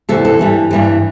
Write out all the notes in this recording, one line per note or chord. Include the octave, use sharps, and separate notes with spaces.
D2 C3 E3 A4
A4
G2 E3 G3
G2 E3 G3